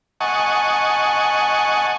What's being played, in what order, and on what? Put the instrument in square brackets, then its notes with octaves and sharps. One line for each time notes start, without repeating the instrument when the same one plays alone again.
[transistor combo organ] D#5 F#5 G#5 A5 C#6